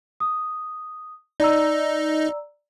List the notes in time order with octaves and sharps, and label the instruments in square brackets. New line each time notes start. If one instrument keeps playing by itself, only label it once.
[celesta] D#6
[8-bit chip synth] D#4 [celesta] D5 A#5 E6